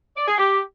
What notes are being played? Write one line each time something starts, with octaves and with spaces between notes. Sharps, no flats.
D5
G#4
G4